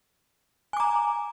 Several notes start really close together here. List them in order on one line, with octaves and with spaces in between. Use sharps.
G#5 D6 A#5